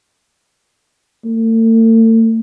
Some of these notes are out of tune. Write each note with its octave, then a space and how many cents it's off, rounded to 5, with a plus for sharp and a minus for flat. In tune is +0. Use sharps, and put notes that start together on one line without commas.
A3 +40